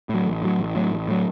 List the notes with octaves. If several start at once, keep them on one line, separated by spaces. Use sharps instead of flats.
A2 F#3
A1
A2 F#3
A1
A2 F#3
A1
A2 F#3